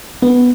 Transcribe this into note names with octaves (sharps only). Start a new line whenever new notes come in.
B3